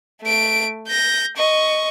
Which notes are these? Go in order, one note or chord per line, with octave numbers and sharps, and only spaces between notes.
A3 D7
G6 A#6
D#5 C#6